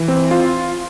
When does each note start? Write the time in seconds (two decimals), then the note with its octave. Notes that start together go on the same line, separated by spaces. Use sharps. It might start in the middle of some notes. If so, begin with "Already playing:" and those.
Already playing: E3
0.08 C4
0.31 F4